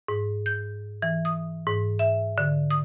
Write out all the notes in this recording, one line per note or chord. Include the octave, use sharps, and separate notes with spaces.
G#2
G6
E3
D#6
G#2
E5
D3
D#6